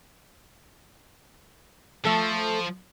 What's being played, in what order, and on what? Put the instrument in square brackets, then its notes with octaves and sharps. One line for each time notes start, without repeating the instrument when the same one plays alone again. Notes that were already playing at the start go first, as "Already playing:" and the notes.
[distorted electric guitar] F3 [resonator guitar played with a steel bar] A3 A4